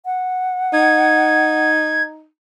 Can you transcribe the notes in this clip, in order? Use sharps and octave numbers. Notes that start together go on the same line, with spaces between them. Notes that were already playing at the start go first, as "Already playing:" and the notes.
F#5
D#4 G#6